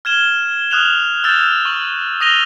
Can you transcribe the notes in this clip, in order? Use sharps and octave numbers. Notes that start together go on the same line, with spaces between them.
F6 G#6 E7 G7
D#6 F6 F#6 E7 F7 G7
E6 F6 G6 A6 E7
C#6 F#7
D#6 F#6 A#6 D#7 F7 G7